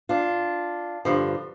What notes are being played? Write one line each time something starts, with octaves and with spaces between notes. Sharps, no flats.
D4 F4
G2 D3 F3